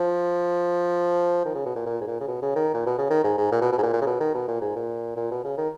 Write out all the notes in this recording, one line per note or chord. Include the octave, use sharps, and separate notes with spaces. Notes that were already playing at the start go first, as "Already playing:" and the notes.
Already playing: F3
D#3
C#3
B2
A#2
A#2
G#2
A#2
C#3
B2
C#3
D#3
A#2
B2
C#3
D#3
G#2
G#2
A#2
B2
B2
G#2
A#2
A#2
C#3
B2
D#3
B2
A#2
G#2
A#2
A#2
B2
C#3
D#3